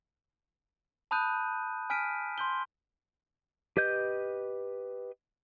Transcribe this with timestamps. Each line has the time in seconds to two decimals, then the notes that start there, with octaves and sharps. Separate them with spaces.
1.11 A5 B5 D#6 F#6 G6 D#7
1.90 G#5 F6 B6 D7 D#7
2.38 C6 G6 G7
3.77 G4 B4 D#5 G6